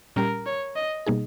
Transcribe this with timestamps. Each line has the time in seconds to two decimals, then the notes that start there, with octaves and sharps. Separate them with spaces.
0.16 A#2 G3 C#4 G4 A#4
0.46 C#5
0.76 D#5
1.06 B2 G3 A#3 D#4 G#4